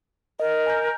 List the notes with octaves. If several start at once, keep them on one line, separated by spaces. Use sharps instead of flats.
A#4 D#5
G#5 A#5 G6